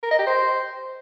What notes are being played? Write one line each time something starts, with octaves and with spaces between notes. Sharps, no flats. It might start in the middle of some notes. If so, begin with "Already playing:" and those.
A#4
D#5
G4
C5